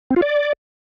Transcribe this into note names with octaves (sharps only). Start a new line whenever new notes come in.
C4
F4
D5